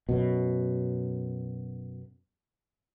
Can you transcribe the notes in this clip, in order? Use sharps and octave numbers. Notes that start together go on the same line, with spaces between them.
F#2 B2